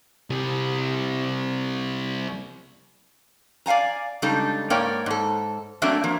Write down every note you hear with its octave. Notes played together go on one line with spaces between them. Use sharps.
C3 G3
D5 F5 F#5 G#5 A#5
C#3 G3 G#3 D4 D#4 A4
G#2 A#3 A#4 C#5 D5 G5
G#2 A4
F#3 A3 A#3 C4 D4 E5
F3 A#3